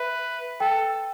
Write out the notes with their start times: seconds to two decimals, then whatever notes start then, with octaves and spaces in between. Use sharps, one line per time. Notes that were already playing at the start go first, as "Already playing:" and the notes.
Already playing: B4 E5
0.60 A4 G5